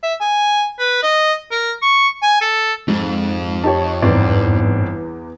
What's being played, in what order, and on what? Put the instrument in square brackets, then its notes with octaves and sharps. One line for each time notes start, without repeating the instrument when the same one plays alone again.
[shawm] E5
G#5
B4
D#5
A#4
C#6
G#5
A4
[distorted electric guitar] F2 [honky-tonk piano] G#2
[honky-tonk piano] D#4 G4 C#5 [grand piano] A5
[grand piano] G1 C4 D5 [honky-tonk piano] E2 B3 E4 [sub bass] G#2